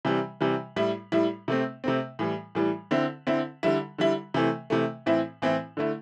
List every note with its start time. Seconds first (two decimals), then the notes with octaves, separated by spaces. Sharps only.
0.05 C3 E3 G3
0.41 C3 E3 G3
0.76 A2 G3 E4
1.12 A2 G3 E4
1.48 C3 A3 C4
1.84 C3 A3 C4
2.19 A2 E3 G3
2.55 A2 E3 G3
2.91 D3 C4 E4
3.27 D3 C4 E4
3.63 D3 G3 E4
3.98 D3 G3 E4
4.34 C3 E3 A3
4.70 C3 E3 A3
5.06 A2 E3 C4 E4
5.42 A2 E3 C4 E4
5.77 D3 A3 E4